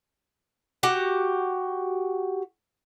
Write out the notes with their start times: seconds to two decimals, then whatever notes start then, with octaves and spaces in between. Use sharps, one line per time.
0.83 F#4 G4 F#5